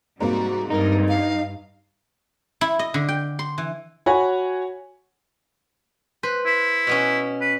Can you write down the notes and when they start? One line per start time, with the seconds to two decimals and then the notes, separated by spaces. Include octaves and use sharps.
0.20 G#2 C3 G3 A#3 F#4
0.70 G2 D#4 A#4
1.08 F5
2.61 E4
2.79 D#5
2.94 D3
3.08 G5
3.39 C6
3.58 E3
4.06 F#4 C#5 F#5 G#5 B5
6.23 B4 C5
6.46 E4
6.87 B2 B3 C#4
7.41 B4